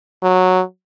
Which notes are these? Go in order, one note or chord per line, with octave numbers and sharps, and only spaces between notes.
F#3